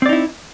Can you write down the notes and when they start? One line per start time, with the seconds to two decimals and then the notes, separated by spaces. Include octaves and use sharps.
0.02 C4
0.06 D5
0.09 D#4
0.13 E4